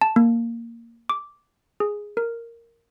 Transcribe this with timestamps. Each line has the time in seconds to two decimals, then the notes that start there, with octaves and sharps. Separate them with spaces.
0.02 A5
0.16 A#3
1.09 D6
1.80 G#4
2.17 A#4